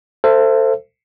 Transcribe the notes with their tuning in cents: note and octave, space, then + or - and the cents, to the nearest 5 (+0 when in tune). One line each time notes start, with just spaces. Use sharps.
A4 +25 C5 +0 E5 +35